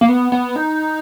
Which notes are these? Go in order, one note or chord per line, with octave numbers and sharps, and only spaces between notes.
A#3
B3
B3
D#4